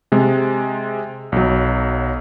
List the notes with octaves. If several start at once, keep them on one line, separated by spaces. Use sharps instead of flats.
C3 G#3
B1 F#3